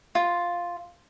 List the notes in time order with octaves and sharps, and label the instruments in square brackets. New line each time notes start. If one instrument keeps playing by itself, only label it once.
[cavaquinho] F4